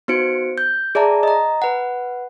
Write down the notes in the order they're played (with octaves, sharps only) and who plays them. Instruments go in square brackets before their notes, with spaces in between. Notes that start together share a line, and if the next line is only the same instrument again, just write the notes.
[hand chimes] B3 D#4 F#4 C5 C#7 D7
G6
G#4 D5 E5 A5 A#5
D#5 A#5
B4 F#5